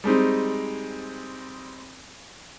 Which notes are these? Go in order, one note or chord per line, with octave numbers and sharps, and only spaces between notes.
G3 G#3 C4 D#4